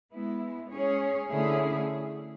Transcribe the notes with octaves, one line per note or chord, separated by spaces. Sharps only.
G#3 B3 E4
G#3 C#4 G#4 C#5
D3 A3 C#4 E4 G#4